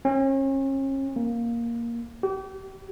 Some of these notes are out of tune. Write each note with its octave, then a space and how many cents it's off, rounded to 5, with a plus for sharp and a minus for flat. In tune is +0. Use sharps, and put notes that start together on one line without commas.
C#4 -40
A#3 +5
G4 -35